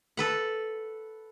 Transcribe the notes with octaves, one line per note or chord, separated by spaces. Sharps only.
A4 B4 F#5